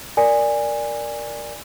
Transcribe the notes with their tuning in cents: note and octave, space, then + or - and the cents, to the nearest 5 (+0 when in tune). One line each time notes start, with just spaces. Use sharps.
A#4 +0 D5 +0 G#5 -15